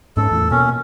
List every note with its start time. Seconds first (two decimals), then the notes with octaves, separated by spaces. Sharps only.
0.17 G#2 C#4 A4
0.31 E2 A2
0.51 B2 A#3 C#4